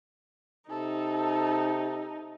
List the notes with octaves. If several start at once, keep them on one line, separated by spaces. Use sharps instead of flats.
C3 D#4 A4